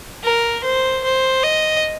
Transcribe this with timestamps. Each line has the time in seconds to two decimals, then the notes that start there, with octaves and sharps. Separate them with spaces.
0.24 A#4
0.64 C5
1.04 C5
1.43 D#5